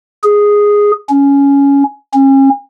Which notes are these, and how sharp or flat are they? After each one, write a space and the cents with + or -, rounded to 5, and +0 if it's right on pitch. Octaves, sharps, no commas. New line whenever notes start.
G#4 -5
C#4 +10
C#4 -35